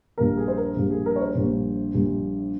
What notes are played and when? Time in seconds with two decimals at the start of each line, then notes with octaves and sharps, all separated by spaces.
0.18 A#1 A#2 G3 A#3 A#4
0.37 G#4
0.48 C5
0.57 A#4
0.76 A#1 A#2 G3 A#3
0.91 G#4
1.06 A#4
1.16 C#5
1.21 C5
1.35 A#1 A#2 G3 A#3
1.94 A#1 A#2 G3 A#3